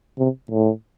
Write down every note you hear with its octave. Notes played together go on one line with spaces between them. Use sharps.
C3
A2